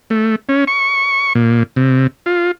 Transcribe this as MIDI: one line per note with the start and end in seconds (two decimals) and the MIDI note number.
0.10 0.36 57
0.49 0.65 61
0.67 1.33 85
1.35 1.63 46
1.76 2.07 48
2.26 2.51 65